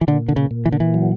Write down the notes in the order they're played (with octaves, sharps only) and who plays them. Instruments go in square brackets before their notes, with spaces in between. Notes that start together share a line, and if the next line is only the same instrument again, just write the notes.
[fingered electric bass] E3
[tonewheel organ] A#2 [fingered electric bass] D3
[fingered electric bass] D3
C#3
[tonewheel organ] A#2
[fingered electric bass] E3
D3
E3
[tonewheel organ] F#3